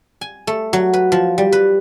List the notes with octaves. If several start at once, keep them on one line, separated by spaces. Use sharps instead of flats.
G#5
A3
F#3
B4
F3
G3
B4